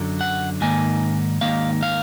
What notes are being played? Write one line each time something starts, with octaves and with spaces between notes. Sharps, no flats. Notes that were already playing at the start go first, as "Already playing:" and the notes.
Already playing: F#2 D3 F#3
F#5
G#2 D#3 A#3 G#5
G#2 D#3 A#3 F5
F5